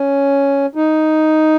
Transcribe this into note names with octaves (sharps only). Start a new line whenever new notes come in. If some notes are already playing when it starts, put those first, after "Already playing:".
Already playing: C#4
D#4